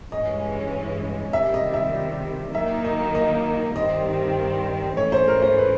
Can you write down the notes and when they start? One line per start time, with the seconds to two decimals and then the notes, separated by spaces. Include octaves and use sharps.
0.12 G2 E3 G#3 C#4 D#5
1.33 C3 D#3 G3 E5
1.54 D#5
1.74 E5
2.54 D#3 F#3 A#3 D#4 E5
2.85 D#5
3.15 D#5
3.76 G2 D#3 G3 C4 D#5
4.97 G#2 E3 A3 C#4 C#5
5.12 C5
5.28 A#4
5.42 C5
5.58 B4